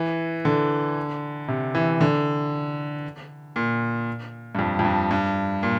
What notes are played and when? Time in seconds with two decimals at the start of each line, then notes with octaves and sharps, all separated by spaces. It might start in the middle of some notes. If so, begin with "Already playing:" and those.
Already playing: E3
0.45 D3
1.48 C3
1.75 E3
2.01 D3
3.56 A#2
4.55 G2
4.59 F2
4.79 F2
4.85 G2
5.11 G2
5.63 A#2